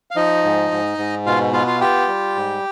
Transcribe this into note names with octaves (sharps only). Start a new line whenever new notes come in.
F5
F3 D#4 D#5
G#2
G#2
G#2
B2 F4 F5
B3 F4 F5
F4 F5
F4 G4 G5
G3
G#2